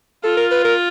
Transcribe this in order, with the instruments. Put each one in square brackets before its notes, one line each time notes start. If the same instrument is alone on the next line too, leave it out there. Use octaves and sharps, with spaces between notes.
[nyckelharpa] F4 [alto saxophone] A4
[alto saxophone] A#4
B4
A#4